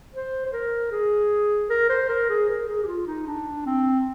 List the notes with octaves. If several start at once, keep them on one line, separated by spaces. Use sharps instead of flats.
C5
C5
A#4
G#4
A#4
C5
A#4
G#4
A#4
G#4
G4
F4
D#4
D4
C4